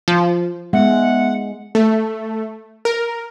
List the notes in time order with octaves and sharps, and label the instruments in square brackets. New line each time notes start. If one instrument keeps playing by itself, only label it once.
[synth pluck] F3
[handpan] G#3 [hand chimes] B3 E5 [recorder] F#5
[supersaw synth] A3
A#4